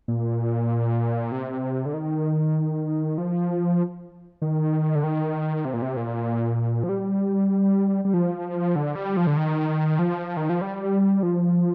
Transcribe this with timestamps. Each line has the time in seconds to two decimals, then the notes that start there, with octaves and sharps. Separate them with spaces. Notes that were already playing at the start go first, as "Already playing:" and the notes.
0.08 A#2
1.32 C3
1.86 D3
1.94 D#3
3.18 F3
4.42 D#3
4.95 D3
5.04 D#3
5.65 C3
5.74 A#2
5.82 C3
5.97 A#2
6.83 F3
6.89 G3
8.05 G3
8.14 F3
8.76 D3
8.95 G3
9.17 F3
9.27 D3
9.37 D#3
9.99 F3
10.37 D#3
10.49 F3
10.61 G3
11.23 F3